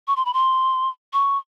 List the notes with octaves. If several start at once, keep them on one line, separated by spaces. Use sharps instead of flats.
C#6
C6
B5
C6
C#6